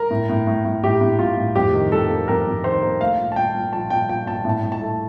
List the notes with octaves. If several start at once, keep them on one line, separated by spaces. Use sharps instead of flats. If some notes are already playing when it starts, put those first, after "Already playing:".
Already playing: A#4
A2
A2
A2
A2
A2 G4
A2
A2 F4
A2
F2 G4
D#3
F2 A4
A#3
F2 A#4
F2
D#3 C5
A#3
A3 F5
A#2
A5
A#2 G5
A#2
F3 A5
A#2 G5
A#2 G5
A#2 A5
A2 A5
A2
A5
A3